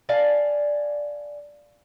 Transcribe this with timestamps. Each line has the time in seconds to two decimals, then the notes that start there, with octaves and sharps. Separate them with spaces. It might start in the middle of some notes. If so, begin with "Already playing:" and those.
0.09 D5 F5 G#5 A5